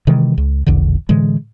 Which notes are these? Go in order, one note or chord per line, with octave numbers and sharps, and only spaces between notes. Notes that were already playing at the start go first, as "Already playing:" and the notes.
C3 D#3 E3 G#3
C#2
E1 A#1 E2 D3
A2 D3 E3 G#3